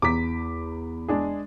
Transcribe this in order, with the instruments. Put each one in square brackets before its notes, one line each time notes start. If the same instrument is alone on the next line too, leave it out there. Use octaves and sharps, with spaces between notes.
[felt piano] E2 A#5 [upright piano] D6 B6
[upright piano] G#3 D4 G#4